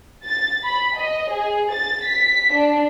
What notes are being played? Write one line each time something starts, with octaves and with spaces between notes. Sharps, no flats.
A6
B5
D#5
G#4
A6
B6
D4